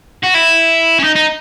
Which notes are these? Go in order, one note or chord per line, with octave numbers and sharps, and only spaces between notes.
F#4
E4
C#4
D#4
D#4